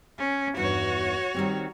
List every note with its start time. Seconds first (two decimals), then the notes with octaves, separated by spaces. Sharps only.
0.18 C#4
0.57 E2 G2 D#4 F#4 C#5
1.34 D#3 G3 C4